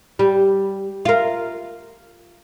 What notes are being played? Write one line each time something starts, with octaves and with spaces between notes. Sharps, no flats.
G3
F4 A#4